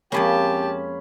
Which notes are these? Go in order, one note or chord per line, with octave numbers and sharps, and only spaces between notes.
F2 G#3 A#3 C#4 G4 A5 B5 C6